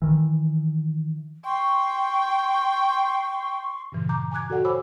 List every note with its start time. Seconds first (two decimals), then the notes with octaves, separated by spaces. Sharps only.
0.02 D#3 E3
1.45 G5 C6 C#6
3.92 G2 A#2 C#3 E3
4.09 A#5 D6 G6
4.31 G#5 A#5 D6 F#6 G#6
4.50 F#4 A4 D5 F#5 G5
4.65 C5 C#5 G#5 B5 D6 E6